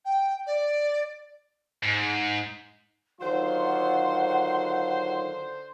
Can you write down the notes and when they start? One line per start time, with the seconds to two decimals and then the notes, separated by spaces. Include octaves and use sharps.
0.05 G5
0.47 D5
1.83 G#2
3.21 D3 D#3 F#3 F4 C5 F#5 C6